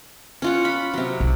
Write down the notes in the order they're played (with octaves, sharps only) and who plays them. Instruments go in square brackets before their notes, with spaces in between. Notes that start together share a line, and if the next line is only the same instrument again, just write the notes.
[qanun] C#4 F4 F#5
B5
C3 F#3
[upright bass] B1